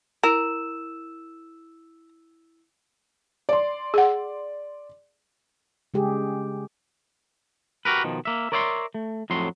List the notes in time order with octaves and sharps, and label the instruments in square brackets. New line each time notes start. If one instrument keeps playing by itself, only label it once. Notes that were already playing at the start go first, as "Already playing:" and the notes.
[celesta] E4 E6 E7 [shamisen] A#4
[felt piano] D5 C6
[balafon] G#4 F#5
[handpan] C#3 G#3 G4 G#4
[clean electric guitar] F#4 G4 A#4 B4
B2 D#3 F3
A#3 E5
A#4 C#5 D5 E5 G5 C6
A3
F2 A2 F#3 C6